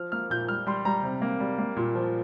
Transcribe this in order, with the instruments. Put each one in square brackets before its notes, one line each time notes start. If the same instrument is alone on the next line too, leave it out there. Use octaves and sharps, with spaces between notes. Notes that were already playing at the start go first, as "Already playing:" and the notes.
Already playing: [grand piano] F3 F6
A#3 F6
A#2 G6
G3 F6
G3 C6
G3 A#5
C3
A#3
G3
A#3
A#2
F3